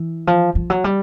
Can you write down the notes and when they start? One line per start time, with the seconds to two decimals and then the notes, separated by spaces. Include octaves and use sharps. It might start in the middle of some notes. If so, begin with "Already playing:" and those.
Already playing: E3
0.27 F3
0.55 F3
0.70 F#3
0.84 G3